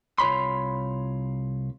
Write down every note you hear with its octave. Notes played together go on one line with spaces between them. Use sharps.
C2 F4 C#5 B5 C6